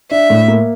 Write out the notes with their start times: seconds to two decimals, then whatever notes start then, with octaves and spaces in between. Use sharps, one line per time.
0.11 D4 E5
0.30 A2
0.48 A#3